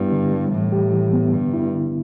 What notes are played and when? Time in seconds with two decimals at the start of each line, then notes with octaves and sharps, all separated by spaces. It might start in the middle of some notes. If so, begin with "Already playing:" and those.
Already playing: G2 B3 E4
0.12 D3
0.32 G3
0.52 A2 E3
0.72 G4
0.93 E3
1.13 B3
1.33 G2 D3
1.53 E4
1.73 D3